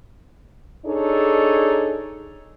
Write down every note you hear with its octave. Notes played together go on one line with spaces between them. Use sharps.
D4 D#4 G#4 A4 C#5